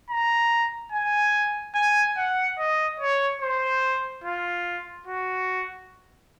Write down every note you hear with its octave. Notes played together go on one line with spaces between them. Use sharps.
A#5
G#5
G#5
F#5
D#5
C#5
C5
F4
F#4